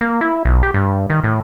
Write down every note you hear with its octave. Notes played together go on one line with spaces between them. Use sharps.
A#3
E4
B1
G4
G2
D#3
A2